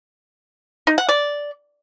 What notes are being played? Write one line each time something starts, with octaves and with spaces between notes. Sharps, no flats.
D#4
F#5
D5